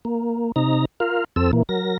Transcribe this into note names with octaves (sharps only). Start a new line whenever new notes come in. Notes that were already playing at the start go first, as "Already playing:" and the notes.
A#3
C3 D#4 A#5
F4 A#4 F5
F2 C4 A4 E6
A#2 E3 A#3
F#3 A#4 A#6